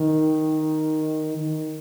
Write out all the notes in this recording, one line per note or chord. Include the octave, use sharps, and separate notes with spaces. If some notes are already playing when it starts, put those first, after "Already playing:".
Already playing: D#3
D#3